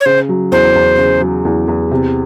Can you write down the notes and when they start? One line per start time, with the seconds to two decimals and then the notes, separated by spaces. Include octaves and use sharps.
0.01 C#5
0.06 C#3 C5
0.29 F#3
0.52 E2 C5
0.75 E2
0.98 C#3
1.21 F#3
1.45 E2
1.68 E2
1.91 C3